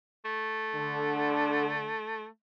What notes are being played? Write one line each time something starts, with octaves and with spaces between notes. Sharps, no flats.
A3
D3